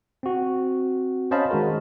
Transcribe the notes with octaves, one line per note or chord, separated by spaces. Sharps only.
C4 F#4
C#4 C5 D#5 F5 A5 B5
D#3 G#3 F#4 A#4